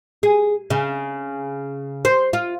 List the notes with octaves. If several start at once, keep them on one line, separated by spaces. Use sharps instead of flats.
G#4
C#3
C5
F4